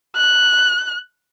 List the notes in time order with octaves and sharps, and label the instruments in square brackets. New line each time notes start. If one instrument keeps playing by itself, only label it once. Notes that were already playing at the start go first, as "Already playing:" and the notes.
[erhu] F#6